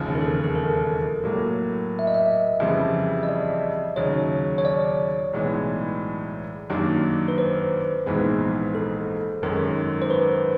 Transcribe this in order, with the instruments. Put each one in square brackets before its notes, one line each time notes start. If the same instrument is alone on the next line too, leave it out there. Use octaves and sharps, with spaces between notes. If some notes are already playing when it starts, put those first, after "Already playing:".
Already playing: [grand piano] E1 D#2 C#3 F3
[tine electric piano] A#4
A4
A4
A#4
[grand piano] A2 F#3 A#3
[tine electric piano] E5
D#5
E5
[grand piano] F2 C#3 E3 G3 C4
[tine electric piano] D#5
D5
[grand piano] D#2 C#3 F#3 [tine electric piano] C#5
[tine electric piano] C#5
D5
[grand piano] B1 A2 E3 G#3 B3
F#2 D#3 F#3 A#3 D4
[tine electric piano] B4
C5
[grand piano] A#1 G#2 E3 G#3 B3
[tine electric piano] A4
[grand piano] G#1 F#2 D#3 G#3 C#4 [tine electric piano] A#4
[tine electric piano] C5
B4